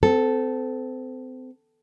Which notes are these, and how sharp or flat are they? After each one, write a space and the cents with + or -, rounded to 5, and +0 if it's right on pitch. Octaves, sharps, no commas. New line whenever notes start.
C4 -30 A4 -5